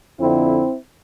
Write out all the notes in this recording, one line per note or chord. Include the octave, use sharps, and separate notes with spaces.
F2 D3 C4 E4